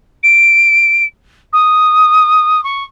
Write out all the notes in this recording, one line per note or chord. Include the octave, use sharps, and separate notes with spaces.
D7
D#6
C#6